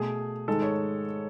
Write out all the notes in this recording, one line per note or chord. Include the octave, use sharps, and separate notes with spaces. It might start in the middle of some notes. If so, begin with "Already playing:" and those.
Already playing: B2 A3 G#4
G#2 D#3 G#3 A4
C#5